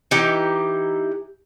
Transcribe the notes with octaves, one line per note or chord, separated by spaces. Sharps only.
E3 D#4 G4 G5